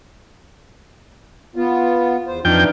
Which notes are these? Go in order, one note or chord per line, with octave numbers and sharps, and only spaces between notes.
B3 F4
E2 C5
F2 E3 D4 D#4 G5